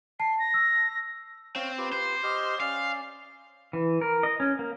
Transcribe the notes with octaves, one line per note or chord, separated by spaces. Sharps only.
A5 C7
A#6
E6
C4 C#5 F5
F4 G4 B4
C5
G4 D#5 F6
C#4 D5 F5
E3
A#4
D#5
C#4
A#3